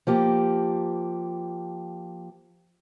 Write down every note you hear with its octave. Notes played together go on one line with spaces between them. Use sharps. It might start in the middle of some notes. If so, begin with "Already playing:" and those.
F3 A#3 G4